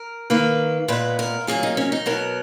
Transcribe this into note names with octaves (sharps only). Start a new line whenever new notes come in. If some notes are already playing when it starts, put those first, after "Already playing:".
Already playing: A#4
D#3 A#3 B4
A#2 G#3 B3 B4
A#4
A#2 F#3 A#3 G#4
D#4
C#4
D#4
B2 F#3 B3 A#4